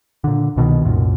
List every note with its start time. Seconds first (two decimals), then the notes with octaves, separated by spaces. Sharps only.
0.24 A#2 D3
0.56 C2 B2 D3 D#3
0.84 C2 F#2 A#2